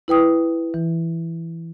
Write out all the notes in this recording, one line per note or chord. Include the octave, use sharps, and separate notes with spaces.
E4 B4 G5 D#6
E3